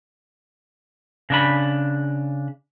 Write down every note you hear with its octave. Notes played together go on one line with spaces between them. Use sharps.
C#3 D4 B5